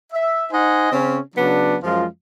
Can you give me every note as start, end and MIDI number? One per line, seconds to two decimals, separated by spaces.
0.13 0.46 76
0.52 0.92 63
0.52 0.92 72
0.52 0.92 75
0.52 0.92 78
0.52 0.92 80
0.92 1.20 49
0.92 1.20 60
0.92 1.20 61
1.36 1.76 49
1.36 1.76 54
1.36 1.76 59
1.36 1.76 62
1.83 2.05 42
1.83 2.05 53
1.83 2.05 56
1.83 2.05 65